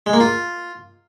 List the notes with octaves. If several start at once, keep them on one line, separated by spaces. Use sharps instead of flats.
G#3
A#3
F4